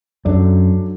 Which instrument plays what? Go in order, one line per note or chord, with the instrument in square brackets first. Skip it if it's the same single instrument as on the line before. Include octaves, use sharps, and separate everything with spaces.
[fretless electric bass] F#2 [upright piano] F#3 A3 D4